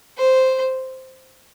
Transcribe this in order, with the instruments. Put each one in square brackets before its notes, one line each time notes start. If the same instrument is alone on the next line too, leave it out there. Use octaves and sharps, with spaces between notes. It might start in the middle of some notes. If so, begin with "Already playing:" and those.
[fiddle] C5